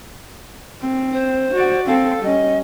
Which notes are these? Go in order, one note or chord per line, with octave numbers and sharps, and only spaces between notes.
C4
C5
F#4 D5
C4 A4 F5
G3 C#4 D#5